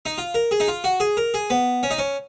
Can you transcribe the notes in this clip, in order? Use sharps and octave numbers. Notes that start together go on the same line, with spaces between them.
D#4
F4
A#4
G#4
D#4
F4
F#4
G#4
A#4
G#4
B3
C#4
D#4
C#4